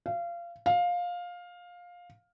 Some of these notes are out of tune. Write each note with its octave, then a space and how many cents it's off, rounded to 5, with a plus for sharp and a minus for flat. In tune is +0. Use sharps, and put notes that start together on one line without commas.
F5 -25
F5 +15